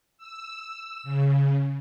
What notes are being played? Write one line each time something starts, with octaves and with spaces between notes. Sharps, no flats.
E6
C#3